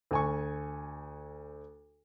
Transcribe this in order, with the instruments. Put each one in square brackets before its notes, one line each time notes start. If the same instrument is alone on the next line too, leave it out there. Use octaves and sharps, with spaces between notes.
[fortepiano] D2 G#5 C#6